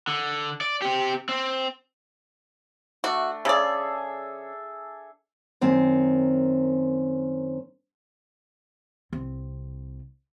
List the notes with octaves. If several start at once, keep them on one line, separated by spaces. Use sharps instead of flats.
D3
D5
C4 G4
C4
A3 D4 F#4
C#3 G#4 A4 D5 E5
F#2 D#3 C4
C2 C4